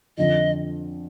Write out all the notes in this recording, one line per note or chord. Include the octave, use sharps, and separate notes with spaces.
F2 D3 F3 D#5